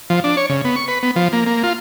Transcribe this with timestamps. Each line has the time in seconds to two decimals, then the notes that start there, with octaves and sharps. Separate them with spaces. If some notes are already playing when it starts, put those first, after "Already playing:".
0.10 F3
0.24 D4
0.37 C#5
0.49 C#3
0.64 B3
0.76 C#6
0.88 B4
1.03 B3
1.16 F3
1.33 A#3
1.47 A#3
1.63 F4